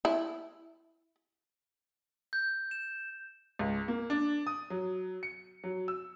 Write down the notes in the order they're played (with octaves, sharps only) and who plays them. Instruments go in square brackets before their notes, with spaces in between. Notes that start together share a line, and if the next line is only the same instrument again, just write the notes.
[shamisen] E4
[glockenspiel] G6
E7
[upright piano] C#2
A#3
D4
D#6
F#3
C#7
F#3
E6